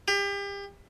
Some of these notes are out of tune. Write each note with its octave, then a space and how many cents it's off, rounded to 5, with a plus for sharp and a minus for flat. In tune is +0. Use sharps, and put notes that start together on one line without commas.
G4 +35